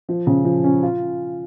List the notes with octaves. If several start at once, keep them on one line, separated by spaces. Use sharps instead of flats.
F3
C#3
F3
C#4
F4